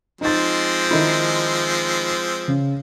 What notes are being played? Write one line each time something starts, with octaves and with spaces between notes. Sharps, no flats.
F3 G#3 C4 D#4 A6
D#3 D#4 E4
C#3